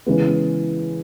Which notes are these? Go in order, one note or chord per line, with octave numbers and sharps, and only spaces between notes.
C#3 E3 G#3 B3